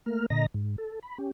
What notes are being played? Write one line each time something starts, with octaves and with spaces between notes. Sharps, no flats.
A3 A#3 A#4 F6
A#2 D3 D#5 A#5 A#6
G#2
A4
B5
C#4 G4